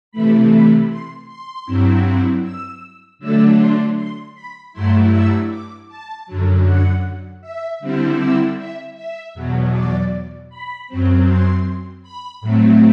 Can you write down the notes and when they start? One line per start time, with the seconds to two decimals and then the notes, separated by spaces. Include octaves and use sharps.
0.11 C3 E3 A3 B5
0.51 B5
0.89 C6
1.27 C6
1.66 G2 F#3 C4 E4
2.43 E6
3.19 D3 F#3 A3 D4 E6
3.58 C6
3.96 C6
4.35 B5
4.72 G2 F#3 A3 E4 C6
5.11 E6
5.49 D6
5.88 A5
6.26 F#2 D3 F#3
6.64 F#5
7.41 E5
7.80 D3 G3 C4 E4
8.19 E5
8.57 E5
8.96 E5
9.34 E2 B2 F#3
9.72 D5
10.49 B5
10.88 F#2 F#3 C4
11.26 C6
12.02 B5
12.41 A2 F#3 A3 C4